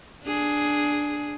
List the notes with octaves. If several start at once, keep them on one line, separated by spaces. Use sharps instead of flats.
D4 G#4